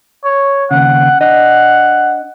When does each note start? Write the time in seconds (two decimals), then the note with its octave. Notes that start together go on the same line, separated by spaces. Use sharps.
0.24 C#5
0.71 D#2 C#3 F#5
1.21 D4 D#5 F#5